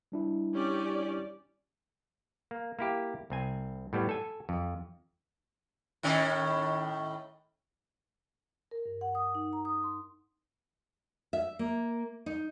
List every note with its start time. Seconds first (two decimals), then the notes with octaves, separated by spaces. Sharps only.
0.12 G3 D4 E4
0.54 C#4 G4 D5
2.51 A#3
2.79 A#3 E4 G4
3.30 C2 C4 G#5
3.93 A2 G3 B3
4.09 A4 G#5
4.49 F2
6.03 A2 D#3 C#4
8.71 A#4
8.86 G2
9.01 F#5
9.15 D#6
9.35 D#4
9.53 A#5
9.65 D#6
9.83 C6
11.33 E5
11.59 A#3
12.26 D#4